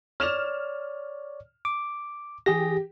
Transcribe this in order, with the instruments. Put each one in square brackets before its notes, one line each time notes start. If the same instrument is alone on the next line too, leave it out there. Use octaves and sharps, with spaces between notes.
[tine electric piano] C#5 D5 [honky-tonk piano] F6 E7 F7
[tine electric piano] D6
[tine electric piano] E3 G#4 A#6 [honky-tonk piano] G4